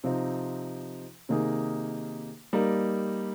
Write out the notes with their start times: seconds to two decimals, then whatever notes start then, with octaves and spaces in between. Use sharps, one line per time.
0.04 C3 F3 C4 D#4
1.29 C3 D#3 A#3 D#4 G#4
2.53 G3 A#3 D#4 A#4